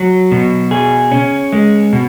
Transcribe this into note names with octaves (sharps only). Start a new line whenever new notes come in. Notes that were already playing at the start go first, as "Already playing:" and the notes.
Already playing: F#3
B2
G#4
C#4
G#3
B2